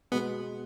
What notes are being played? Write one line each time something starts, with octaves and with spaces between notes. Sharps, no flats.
B2 G#3 B3